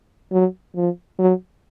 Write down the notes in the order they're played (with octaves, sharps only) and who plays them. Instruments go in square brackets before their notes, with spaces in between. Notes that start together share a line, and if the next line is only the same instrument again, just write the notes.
[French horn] F#3
F3
F#3